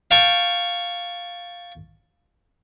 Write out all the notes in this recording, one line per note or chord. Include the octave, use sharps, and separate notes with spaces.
F5 G5 A5 C#6